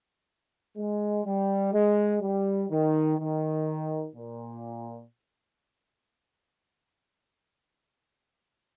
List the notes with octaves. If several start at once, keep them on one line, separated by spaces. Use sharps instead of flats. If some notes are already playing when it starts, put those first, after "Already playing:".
G#3
G3
G#3
G3
D#3
D#3
A#2